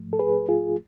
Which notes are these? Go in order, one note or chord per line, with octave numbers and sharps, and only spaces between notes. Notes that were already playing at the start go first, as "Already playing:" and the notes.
Already playing: G#2 F3 A3
A4
G#4 B4
F4 G#4